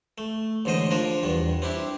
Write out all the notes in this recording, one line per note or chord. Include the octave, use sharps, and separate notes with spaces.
A3
A1 G#2 D3 C5 D#5
F3 D4 F4 A#4
E2 G2
C4 D4 E4 G4